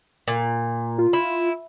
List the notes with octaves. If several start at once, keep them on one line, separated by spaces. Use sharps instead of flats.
A#2
F4
E4